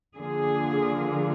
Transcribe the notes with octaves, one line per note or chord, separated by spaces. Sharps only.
D3 F3 A#3 F4 G#4